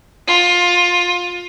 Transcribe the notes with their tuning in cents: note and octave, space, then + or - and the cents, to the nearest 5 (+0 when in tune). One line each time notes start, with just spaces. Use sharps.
F4 +20